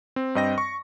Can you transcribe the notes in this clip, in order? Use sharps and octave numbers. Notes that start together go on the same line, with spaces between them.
C4
G2 C4 D#5 G5 A#6
C#6